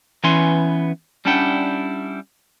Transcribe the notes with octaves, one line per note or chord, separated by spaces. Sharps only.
E3 B3 C#4 G#5 C6
G3 C#4 D4 E4 F#5 G5